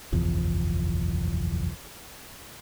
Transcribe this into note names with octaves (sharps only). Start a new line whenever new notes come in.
F#1 B1 E2 F3